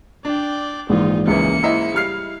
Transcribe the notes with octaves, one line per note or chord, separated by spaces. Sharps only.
D4 D5 G5
A#1 G#2 E3 D#4 F4
C#2 F#2 E3 A#3 C#7
G#2 E4 D#5 E5
G3 F5 F6 C7